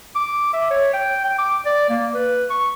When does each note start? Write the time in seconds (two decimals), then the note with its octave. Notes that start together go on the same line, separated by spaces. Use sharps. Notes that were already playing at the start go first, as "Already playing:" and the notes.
0.15 D6
0.53 E5
0.71 C#5
0.93 G5
1.24 G5
1.39 D6
1.66 D5
1.89 A#3
2.14 B4
2.50 C#6